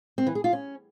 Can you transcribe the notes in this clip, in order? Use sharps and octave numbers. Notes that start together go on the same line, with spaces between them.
C4
E3
G#4
F4
C#4